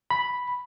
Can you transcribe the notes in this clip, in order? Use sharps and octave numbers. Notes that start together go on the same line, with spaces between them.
B5